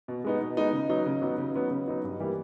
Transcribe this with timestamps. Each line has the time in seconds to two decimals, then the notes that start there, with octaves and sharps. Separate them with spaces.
0.08 B2
0.24 G#3 B3 D#4
0.40 B2
0.57 G#3 B3 D#4
0.73 C#3
0.90 F#3 B3 D#4
1.06 C#3
1.22 F#3 B3 D#4
1.38 C#3
1.55 F#3 B3 D#4
1.71 C#3
1.88 F#3 B3 D#4
2.04 G2
2.20 E3 G3 A#3